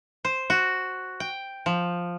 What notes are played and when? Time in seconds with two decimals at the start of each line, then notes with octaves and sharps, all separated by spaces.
0.25 C5
0.50 F#4
1.20 G5
1.66 F3